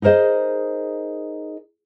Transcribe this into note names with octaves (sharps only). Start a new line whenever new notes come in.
D#4 G#4 A#4 C5 D#5